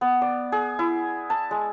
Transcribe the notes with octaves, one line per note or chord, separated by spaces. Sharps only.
B3
D5
G#4
E4
A5
G#3